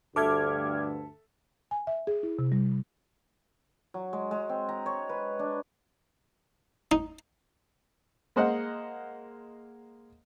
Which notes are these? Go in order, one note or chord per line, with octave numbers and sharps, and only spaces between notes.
D2 G2 A4 E5 D6 F6 G#6
G#5
E5
G#4
E4
C3
G3
F#3
G#3
G#3
C4
A#5
C#5
B4
D4
D#4
G#3 A#3 C5 D#5 F#5